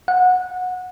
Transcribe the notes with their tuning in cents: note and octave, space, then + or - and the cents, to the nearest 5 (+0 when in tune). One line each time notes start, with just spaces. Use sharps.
F#5 -20